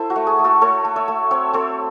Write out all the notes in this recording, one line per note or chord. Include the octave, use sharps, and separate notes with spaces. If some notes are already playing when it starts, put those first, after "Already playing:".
Already playing: E4 A4 C5
F#4
A3
G#4
A3
F#4 A4
A3 A4 C#5
A3
C#5 E5
A3
C4 C#5 E5
C4 A4 C#5